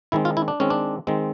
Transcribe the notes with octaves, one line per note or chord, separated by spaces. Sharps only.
D#3 G#3 C4 E4
F4
E4
D4
D#3 G#3 C4 C#4
D4
D#3 G#3 C4